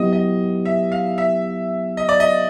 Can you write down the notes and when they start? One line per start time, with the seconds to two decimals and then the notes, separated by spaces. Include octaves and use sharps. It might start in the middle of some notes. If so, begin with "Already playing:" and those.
Already playing: F#3 B3 E4 G4 D#5
0.13 D#5
0.65 E5
0.92 F5
1.18 E5
1.97 D#5
2.09 D5
2.20 D#5